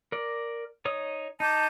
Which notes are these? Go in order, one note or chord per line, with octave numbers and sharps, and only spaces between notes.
A#4 D5
D#4 C#5 D#6
D#4 A5 D6 G6